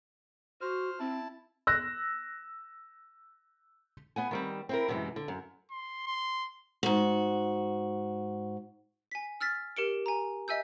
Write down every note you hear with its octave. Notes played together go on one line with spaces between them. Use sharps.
F#4 C5 F6
C4 E4 A5
E6 F#6 A#6
B3 F#5 G#5
D#3 G3 C4
C4 E4 A#4
F#2 C3 E3 G#3
D3
F#2
C6
C6
G#2 F#4
G#5 B6
E6 F6 A6 B6
G4 A#4 C#7 D7
G#5 A#5
D#5 E5 G#5 E6 G6